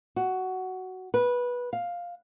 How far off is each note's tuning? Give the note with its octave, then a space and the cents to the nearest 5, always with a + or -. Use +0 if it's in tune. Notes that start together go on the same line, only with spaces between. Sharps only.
F#4 +10
B4 -15
F5 +5